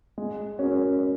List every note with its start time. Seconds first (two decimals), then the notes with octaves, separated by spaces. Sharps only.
0.18 G#3
0.59 C#4 F#4 A#4